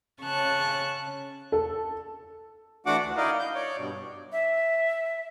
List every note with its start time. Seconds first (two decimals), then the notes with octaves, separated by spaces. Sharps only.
0.22 C#3 C#4 A5 C#6 F#6
1.52 A4
2.86 E3 A3 D4 F#4 F#5 D6
3.03 D2
3.17 D#4 E4 A#4 D5 D#5 F5
3.39 G6
3.54 C#5 D5
3.77 G2 B2
4.32 E5